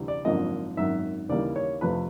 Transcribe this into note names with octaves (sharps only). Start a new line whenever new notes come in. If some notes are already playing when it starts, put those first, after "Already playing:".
Already playing: D2 C3 E3 G3
D5
G#1 F#2 D3 F3 A#3 D#5
G#1 F#2 D#3 E5
D#2 C#3 E3 G3 A#3 D5
C#5
F2 C3 F3 A3 B4